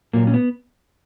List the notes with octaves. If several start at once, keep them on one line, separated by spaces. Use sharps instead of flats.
A#2 F#3 A#3
C#4
B3